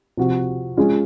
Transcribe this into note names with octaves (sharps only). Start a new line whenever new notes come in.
C3 F3 C4 F#4
G#3 C#4 F4 G#4